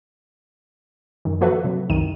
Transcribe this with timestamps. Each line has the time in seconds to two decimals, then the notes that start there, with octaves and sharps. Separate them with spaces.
1.25 F#2 D#3
1.41 F3 A#3 F#4 A4 B4 E5
1.64 C3 F#3
1.90 C2 F#2 D#3 D#7